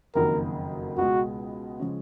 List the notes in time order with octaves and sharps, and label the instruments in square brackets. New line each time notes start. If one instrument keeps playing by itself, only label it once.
[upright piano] F#1 F2 D#3 F#3 A#3 [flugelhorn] A#4
[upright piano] C#2 B2 G#3 [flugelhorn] F#4
[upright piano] C#3 F3 G#3 C#4